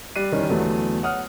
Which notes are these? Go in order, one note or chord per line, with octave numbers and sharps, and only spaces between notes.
G3 F#6 C7 D#7
D#3 E3 G3 C#4
E2 D3 F#3 A3 B3
C#5 F#5 D#6 F6